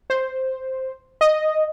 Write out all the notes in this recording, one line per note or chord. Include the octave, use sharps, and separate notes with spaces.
C5
D#5